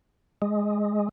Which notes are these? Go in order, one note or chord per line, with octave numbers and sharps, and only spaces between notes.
G#3